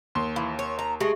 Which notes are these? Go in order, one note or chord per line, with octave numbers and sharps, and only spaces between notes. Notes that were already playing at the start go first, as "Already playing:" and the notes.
D#2 C6
E3 F5
C#5
A#5
G#3 A3 G4 E5 C#6